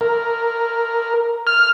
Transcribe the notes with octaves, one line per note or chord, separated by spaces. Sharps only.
A#4
F6